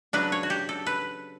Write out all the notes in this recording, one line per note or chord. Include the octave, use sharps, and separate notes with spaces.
C#3 F#3 B3 D4 B4
C#5
F#4
G4
A4
B4